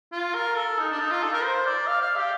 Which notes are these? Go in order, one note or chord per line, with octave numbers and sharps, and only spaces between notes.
F4
A#4
A4
D#4
D4
D#4
F4
A4
A#4
C5
D5
F5
F5
G4